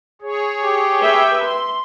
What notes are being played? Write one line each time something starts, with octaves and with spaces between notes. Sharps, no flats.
G#4 C#5
G4
B4 E5 G5
C6